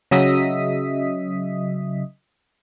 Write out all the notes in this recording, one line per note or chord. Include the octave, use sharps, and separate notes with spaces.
C#3 F#3 D#5 E5 D#6 B6